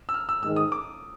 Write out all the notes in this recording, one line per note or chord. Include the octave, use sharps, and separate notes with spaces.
E6
F6
E6
G#2 D#3 G#3 E6
D#6
D6